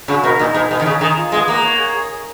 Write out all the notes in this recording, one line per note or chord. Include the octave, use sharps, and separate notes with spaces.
C#3 F#4
B2 A#4
A#2 D#4
B2 G#4
B2 G#4
D#3
C#3 G#4
D#3 G#4
F4
G#3 B3
A#3 F#5
C#5
G#4
G#4
G#4